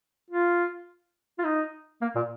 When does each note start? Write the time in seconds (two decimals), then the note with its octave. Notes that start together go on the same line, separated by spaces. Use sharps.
0.30 F4
1.39 F4
1.44 D#4
2.02 A#3
2.15 A#2